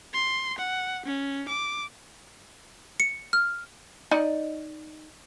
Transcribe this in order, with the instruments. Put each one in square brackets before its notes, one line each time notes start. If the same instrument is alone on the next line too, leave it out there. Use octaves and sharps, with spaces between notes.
[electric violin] C6
F#5
C#4
D6
[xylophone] C#7
F6
[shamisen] D#4 D5 D#5